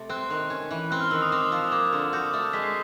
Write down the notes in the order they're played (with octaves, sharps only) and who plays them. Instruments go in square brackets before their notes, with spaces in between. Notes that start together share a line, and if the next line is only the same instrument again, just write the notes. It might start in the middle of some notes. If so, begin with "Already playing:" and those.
Already playing: [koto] C3 A3
[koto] C4 [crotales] F#6
[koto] D#3
C#4
E3
[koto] C4 [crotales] F#6
[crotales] F6
[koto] D#3 [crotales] E6
[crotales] D#6
[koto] C4 [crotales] D6
[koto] F3
[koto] A#3 [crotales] D6
[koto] D3
[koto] F#4 [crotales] G6
[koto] A3
[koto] G#3 [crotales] B6
[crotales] C7